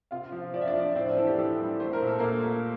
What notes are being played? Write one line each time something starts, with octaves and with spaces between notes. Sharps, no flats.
C3 F4 F5
F3
F3 D5
E5
D4 D5
F3
A2 C4 C5
D4 D5
E3 A4
G4
E3 A4
G3
A3 C5
A#4
A#2
A4
A#2 A#3 A#4
A3